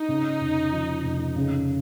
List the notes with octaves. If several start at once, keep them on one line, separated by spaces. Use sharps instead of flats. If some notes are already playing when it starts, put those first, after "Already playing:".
Already playing: D#4
C#3
F1
F3
F1
C#3